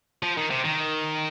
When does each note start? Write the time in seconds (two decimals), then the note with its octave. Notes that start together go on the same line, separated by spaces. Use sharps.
0.23 F3
0.37 D#3
0.51 C3
0.65 D#3